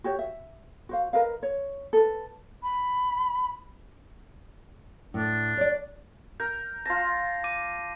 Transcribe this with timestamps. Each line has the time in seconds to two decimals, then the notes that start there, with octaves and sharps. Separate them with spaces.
0.04 F#4 G4 C#5
0.19 E5
0.89 F#4 C5 F5
1.13 A#4 B4 D#5 F5
1.43 C#5
1.93 A4 B4
2.63 B5
5.14 A2 D4
5.57 C#5 D5
6.40 A#4 G6
6.86 F4 A5 A#6
7.44 D6 D#7